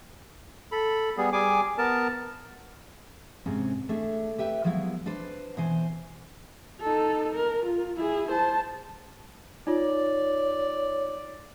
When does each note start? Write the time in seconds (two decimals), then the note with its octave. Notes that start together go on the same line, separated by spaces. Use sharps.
0.72 A4 B5
1.17 G3 B3 G#4
1.33 G3 G#4 G#5 D6
1.78 B3 A#4 A5
3.46 G#2 C3 C4 C#4
3.89 A3 D4 G#4 E5
4.38 G4 B4 E5 G5
4.64 F3 F#3 G#3 B3 E4
5.06 D4 B4 C5 D5
5.57 B2 E3 C5 G#5
6.81 D#4 A4
7.35 A#4
7.66 F4
7.97 E4 G#4
8.31 C5 A5
9.67 D#4 F4 C#5 D5